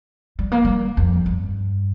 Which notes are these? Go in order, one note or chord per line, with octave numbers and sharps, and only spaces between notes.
G3
A#3
G3
F2
G2